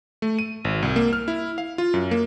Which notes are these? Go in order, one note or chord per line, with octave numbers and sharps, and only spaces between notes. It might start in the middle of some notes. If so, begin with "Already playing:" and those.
A3
D#7
G#1
C2
A#3
F6
E4
F5
F4
F#2
A#3